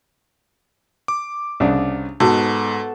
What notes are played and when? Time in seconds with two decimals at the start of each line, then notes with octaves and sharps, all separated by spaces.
1.08 D6
1.60 C2 C#3 D4
2.20 G#2 B2 B3 F#4 A4